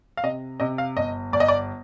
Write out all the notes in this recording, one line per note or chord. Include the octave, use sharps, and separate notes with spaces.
F5
C3 D#5
C3 D#5
F5
G1 D#5
G1 D5
D#5
D5